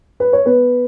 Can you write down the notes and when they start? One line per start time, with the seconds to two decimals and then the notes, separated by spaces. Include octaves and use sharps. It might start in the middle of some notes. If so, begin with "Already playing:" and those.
0.20 B4
0.33 C#5
0.46 B3 B4